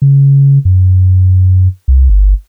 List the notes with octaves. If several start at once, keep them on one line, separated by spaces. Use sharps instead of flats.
C#3
F#2
C2
G1